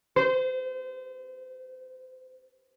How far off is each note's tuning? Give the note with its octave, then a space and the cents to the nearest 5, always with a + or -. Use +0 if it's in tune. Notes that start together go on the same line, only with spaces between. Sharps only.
C5 -30